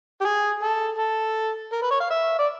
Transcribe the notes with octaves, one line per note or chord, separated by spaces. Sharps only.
G4
G#4
A4
A4
A#4
B4
C#5
F5
E5
D5